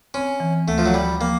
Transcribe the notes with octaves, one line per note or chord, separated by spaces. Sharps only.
C4 C#4
E3
D2 A3
F3
F#3
F3 G3
F3 A#3